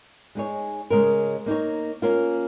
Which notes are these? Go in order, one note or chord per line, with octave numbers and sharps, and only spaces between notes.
G#3 D#4 G#4 C#5
C#3 G#3 C#4 A#4
A#3 D#4 C#5
A#3 C#4 F4 A#4